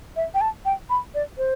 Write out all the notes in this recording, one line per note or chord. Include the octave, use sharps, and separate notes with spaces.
E5
G5
A5
G5
B5
D5
C5